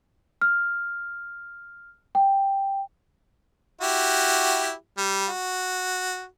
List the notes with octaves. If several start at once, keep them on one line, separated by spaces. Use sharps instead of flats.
F6
G5
E4 F#4 G4
G3
F#4